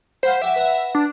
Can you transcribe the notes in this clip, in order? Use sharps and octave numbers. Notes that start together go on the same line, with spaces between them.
C5 F5 F#5 B5
F#4 E5 G5 D6
B4 F#5 A#5
D4